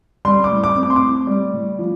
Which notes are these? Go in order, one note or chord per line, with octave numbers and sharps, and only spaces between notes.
G3 C6
D6
A2
D6
C4
D6
C6
D6
A2
G3
A2
F3